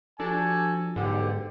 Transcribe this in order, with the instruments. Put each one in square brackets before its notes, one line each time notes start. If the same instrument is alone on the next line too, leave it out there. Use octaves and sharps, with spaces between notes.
[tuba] F3 [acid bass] D4 [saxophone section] F#4 G4 A4 [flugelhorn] G#5
[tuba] B1 [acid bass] G#2 [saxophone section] D3 [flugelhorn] G4